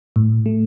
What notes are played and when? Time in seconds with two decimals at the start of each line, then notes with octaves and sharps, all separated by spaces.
0.16 A2
0.46 A3